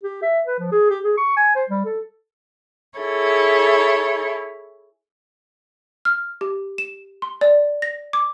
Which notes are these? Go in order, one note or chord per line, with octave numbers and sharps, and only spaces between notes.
G4
E5
B4
F3
G#4
G4
G#4
C#6
G#5
C5
G3
A4
E4 G#4 A4 C#5
F6
G4
E7
C6
D5
A#6
D6